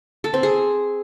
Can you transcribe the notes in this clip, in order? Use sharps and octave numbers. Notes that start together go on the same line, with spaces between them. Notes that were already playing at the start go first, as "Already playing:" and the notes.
A4
C4
G#4